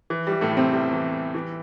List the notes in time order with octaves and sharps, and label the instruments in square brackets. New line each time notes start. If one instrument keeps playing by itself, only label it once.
[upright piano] E3
G3
E3
A2 A3
E3
C3 C4
E2 G3
E3
E2
E3